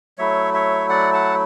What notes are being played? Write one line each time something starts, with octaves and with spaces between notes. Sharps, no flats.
F#3 A3 E4 C#5 E5
C#5 E5
D5 F#5
F#5 A5